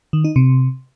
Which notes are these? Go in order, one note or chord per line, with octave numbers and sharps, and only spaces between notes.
D#3
D#4
C3